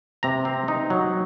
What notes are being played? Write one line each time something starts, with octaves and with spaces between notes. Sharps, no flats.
C3 A#5
C4
D#4
F#3